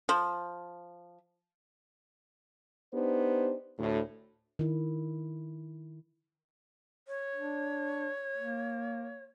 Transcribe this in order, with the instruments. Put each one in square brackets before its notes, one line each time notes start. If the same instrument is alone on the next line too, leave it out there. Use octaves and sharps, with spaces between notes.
[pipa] F3
[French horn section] B3 D4 D#4 G4 C5
D2 A2
[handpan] D#3 E4
[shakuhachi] C#5
[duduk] D4
A#3